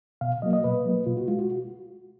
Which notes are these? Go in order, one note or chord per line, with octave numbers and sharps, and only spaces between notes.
B2 F5
F#3 A#3 D#5
D#5
B2 B4
F#3 A#3
B2 F4
F#4
G#3 F4
F#4